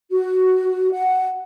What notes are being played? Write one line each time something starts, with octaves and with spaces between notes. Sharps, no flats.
F#4
F#5